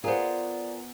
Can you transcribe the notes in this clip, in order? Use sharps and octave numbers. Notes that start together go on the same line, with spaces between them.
B3 F4 G#4 A#4 C5 D5 G#5 A#5